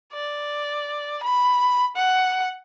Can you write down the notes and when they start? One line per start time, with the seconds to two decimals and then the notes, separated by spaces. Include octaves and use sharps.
0.12 D5
1.23 B5
1.96 F#5